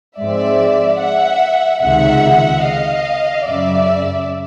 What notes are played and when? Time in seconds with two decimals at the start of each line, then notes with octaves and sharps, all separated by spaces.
0.19 G#2 F3 G#3 C4 D5 E5
1.01 E5 F#5
1.83 C#2 C3 D#3 G#3 E5 F#5
2.64 D#5 F5
3.46 F#2 C#3 F#3 D5 E5